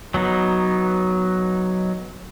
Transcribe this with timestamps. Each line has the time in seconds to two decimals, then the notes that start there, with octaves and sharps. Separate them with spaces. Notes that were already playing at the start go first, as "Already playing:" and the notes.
0.14 F#3 B3 D#4